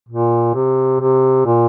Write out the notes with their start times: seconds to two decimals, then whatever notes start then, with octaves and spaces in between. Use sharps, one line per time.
0.08 A#2
0.54 C3
1.01 C3
1.46 A#2